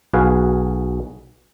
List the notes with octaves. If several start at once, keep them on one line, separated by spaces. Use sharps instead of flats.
B1 F#4 G#4 B4 F5